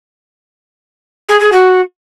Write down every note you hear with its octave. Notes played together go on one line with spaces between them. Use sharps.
G#4
G#4
F#4